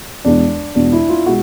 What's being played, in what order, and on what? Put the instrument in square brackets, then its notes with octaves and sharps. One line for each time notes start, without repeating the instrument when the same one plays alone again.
[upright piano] E2 B2 G#3 B3 [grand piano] D4
[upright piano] E2 B2 G#3 B3 [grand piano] D4
[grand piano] E4
F4
[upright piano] B2 G#3 [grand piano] F#4